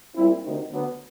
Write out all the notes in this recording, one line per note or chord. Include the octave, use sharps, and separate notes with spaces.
A#2 G3 C4 E4
D2 C3 D#3
D2 D3 F#3 B3